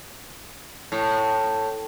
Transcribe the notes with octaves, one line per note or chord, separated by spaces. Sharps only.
A2